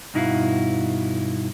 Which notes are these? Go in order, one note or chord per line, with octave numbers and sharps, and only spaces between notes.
G2 B2 D#4 E4 F#4 F5